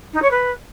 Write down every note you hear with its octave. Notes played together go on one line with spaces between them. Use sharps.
D#4
C#5
B4